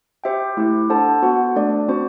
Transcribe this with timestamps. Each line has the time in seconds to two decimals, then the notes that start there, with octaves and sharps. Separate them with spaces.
0.24 G4 C5 E5 G5
0.57 A3 E4 G4
0.89 D4 A4 C5 F#5 A5
1.22 B3 F#4 C5 F#5
1.56 A3 D4 A4 D5
1.88 C4 F#4 C5